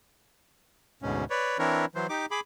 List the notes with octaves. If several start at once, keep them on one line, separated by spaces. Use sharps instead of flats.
D2 G#2 B2 C#4
B4 C#5 D5
E3 C4 D4 E4 A#4 C#5
E3 F#3 C5
D#4 G4 D6
G#4 B5 D6